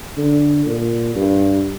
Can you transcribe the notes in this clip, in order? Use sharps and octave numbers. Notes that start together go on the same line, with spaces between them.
D3
A#2
G2